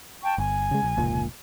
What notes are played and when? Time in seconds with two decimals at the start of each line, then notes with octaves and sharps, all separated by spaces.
0.22 G5 A5 C#6
0.38 G1 G#5
0.71 C#3 G#3
0.83 A#1
0.97 F1 C#2 A#2